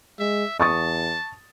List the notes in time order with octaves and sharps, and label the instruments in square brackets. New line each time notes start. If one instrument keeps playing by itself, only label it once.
[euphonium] G#3 [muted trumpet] E5
[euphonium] E2 [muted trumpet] A5 [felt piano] C#6 D#6 A6